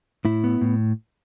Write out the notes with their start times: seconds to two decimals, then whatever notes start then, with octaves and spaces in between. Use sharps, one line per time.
0.25 A2 E4
0.44 B3
0.61 A2